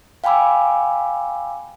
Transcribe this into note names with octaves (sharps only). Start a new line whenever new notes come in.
F5 G5 G#5 B5 D6 E6